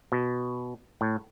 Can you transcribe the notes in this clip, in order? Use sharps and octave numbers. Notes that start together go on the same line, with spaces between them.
B2
A2